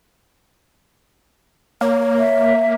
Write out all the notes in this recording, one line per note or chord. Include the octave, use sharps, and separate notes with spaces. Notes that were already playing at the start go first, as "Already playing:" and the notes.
A#3 C#5
E5